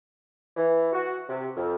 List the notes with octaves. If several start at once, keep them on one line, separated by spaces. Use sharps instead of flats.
E3
F#4
C3
F2